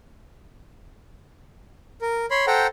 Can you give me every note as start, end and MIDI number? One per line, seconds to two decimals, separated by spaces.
2.01 2.26 70
2.31 2.45 73
2.31 2.45 83
2.31 2.45 84
2.47 2.67 69
2.47 2.67 72
2.47 2.67 78
2.47 2.67 79
2.47 2.67 82